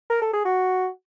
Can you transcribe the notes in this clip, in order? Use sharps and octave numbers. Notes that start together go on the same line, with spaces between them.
A#4
A4
G#4
F#4